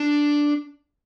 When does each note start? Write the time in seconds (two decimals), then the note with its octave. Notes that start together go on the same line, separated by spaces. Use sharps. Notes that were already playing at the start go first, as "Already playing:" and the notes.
Already playing: D4